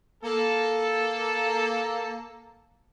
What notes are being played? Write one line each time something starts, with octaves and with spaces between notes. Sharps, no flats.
A#3 A4